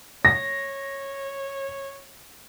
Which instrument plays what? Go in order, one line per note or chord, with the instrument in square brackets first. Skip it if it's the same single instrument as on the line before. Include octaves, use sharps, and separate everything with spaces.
[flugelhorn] C#5 [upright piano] A#6